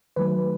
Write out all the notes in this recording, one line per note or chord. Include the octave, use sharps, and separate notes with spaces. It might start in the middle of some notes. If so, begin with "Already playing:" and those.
D#3 F#3 A3 B4